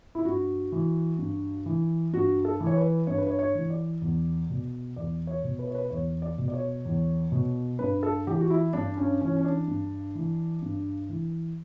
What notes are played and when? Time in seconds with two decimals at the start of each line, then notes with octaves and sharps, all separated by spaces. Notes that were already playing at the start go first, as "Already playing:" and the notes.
0.15 E4
0.25 G2 F#4
0.72 E3
1.19 G2
1.66 E3
2.13 G2 F#4
2.45 A4
2.60 E3
2.67 C#5
2.77 B4
3.07 G2 C#5
3.18 B4
3.27 C#5
3.39 C#5
3.55 E3
3.70 D5
4.02 E2
4.50 B2
4.96 E2 D5
5.27 C#5
5.44 B2
5.59 B4
5.67 C#5
5.75 B4
5.90 E2 C#5
6.22 D5
6.38 B2
6.48 D5
6.54 C#5
6.85 E2
7.32 B2
7.79 G2 B4
8.03 A4
8.27 E3 G4
8.41 F#4
8.50 E4
8.73 G2 D4
8.97 C#4
9.21 E3 C#4
9.36 C#4
9.45 D4
9.68 G2
10.15 E3
10.62 G2
11.09 E3